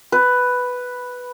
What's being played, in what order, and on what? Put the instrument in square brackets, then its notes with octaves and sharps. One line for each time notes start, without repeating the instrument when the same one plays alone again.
[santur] B4